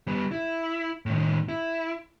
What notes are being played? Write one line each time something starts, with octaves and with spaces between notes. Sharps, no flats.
G3 B3
E4
A2 D#3
E4